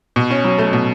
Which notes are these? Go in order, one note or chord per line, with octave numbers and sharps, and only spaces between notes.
B2
C#4
F#3
A3
B2